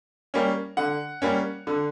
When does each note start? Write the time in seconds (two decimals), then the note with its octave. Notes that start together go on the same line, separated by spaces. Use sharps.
0.34 G3 A#3 C#4
0.77 D3 F#5
1.22 G3 A#3 C#4
1.67 D3